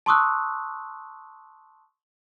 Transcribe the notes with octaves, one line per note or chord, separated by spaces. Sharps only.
A5 C6 C#6 D#6 E6 F#6